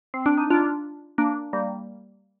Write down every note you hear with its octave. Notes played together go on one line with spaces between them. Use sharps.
C4
D4
D#4
D4 F4
A#3 D4
G3 A#3